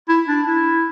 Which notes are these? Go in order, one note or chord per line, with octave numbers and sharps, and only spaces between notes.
E4
D4
E4